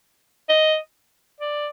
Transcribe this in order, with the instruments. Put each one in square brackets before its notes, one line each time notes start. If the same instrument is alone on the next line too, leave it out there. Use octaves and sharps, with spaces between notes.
[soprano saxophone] D#5
D5